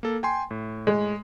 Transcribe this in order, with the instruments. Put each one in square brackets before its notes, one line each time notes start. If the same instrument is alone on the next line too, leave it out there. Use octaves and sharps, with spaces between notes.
[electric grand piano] A#3 A4
G5 G#5 C6
A2
[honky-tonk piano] G#3